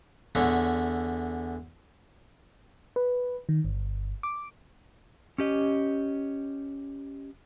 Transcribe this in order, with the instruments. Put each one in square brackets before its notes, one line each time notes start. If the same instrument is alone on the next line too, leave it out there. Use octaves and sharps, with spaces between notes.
[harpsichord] E2 D3 E4 C#5 C6
[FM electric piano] B4
D#3
G1
D6
[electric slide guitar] C#4 G4 D#5